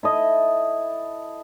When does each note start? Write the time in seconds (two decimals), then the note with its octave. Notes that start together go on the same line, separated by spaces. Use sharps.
0.03 E4 A4 D#5